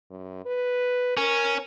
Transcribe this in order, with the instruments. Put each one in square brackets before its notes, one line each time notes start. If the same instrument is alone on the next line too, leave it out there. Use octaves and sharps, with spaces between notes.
[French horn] F#2
B4
[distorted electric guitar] C#4 [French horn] A#4